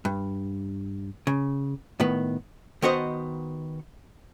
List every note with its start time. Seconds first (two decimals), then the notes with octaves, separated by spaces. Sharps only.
0.05 G2
1.27 C#3
2.00 A2 D#3 B3
2.82 D#3 B3 F#4 C5 D#5